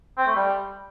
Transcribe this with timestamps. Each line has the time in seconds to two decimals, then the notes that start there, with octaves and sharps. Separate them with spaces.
0.18 C4
0.27 A3
0.36 G3